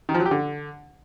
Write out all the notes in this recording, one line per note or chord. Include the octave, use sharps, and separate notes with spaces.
D#3
F3
F#3
G4
D3